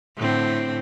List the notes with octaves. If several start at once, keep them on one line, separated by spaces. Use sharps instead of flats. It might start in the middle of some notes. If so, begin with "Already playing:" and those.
A2 D3 C4